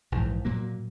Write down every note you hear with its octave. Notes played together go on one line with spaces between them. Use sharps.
A#1 G#2 E3
A#2 F#3 A#3